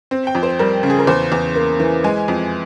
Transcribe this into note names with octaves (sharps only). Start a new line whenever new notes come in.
C4
G5
F2
C5
G3 A#4
C#3
G#4
A#4
E2 C5
E2
A#3
E3
G#3 G#5
F2